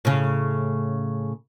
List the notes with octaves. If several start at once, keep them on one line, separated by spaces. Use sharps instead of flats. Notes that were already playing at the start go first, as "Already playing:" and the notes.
A2 C#3